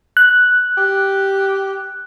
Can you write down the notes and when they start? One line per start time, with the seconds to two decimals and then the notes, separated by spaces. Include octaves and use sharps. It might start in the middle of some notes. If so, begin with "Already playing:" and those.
0.17 F#6
0.77 G4